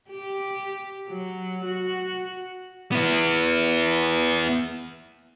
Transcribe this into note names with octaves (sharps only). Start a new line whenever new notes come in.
G4
F#3
F#4
B3 E4